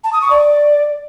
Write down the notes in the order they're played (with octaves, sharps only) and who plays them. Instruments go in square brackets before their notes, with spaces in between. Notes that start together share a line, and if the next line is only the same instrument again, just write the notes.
[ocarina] A5
D#6
C#6
D5